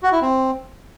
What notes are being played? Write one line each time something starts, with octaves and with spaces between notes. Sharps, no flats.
F#4
E4
C4